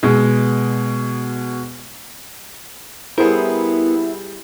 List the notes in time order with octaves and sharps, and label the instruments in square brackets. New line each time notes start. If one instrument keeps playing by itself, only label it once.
[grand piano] B2 G#3
[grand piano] G3 G#4 C5 [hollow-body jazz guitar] B3 A#4 [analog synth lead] E4